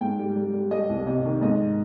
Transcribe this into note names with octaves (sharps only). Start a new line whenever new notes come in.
G#2 G5
G3
G3
G3
G3 D#5
C2
C3 D#5
D#3
G#2 D#5